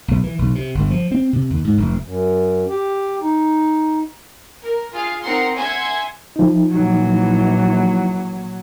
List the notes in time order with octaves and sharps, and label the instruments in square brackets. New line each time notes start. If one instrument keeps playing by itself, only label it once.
[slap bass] B1
E3
B1
C3
G1
F3
C4
C3
D#2
G#2
F1
[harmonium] F#2
G4
D#4
[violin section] A#4
F4 G#4 F5
C4 D#4 A#4 F#5 C6 C7
E5 F#5 G#5 C6 G#6
[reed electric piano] F3 D#4
[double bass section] A#1 E3 [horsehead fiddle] F#3